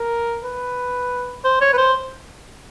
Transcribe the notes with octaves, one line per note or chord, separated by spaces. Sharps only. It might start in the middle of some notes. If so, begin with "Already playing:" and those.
Already playing: A#4
B4
C5
C#5
B4
C5